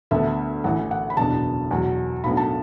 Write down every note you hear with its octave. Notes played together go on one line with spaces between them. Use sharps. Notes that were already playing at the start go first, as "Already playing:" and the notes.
D2 D3 B3 D4 E5
A1 A2 E3 F#5
F#5
B5
F#1 E2 B2 B3 D4 A5
E2 B2 F#3
B1 A2 F#3 B3 D4 B5
A5